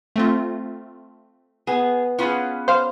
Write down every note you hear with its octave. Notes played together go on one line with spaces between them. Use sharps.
A3 C4 F4
B3 G#4
B3 C#4 F4 G#4 B5
C5 F5